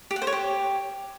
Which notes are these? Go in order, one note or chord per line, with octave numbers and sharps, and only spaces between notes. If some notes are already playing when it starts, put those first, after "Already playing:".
G4
F#5
C5
C#5
G4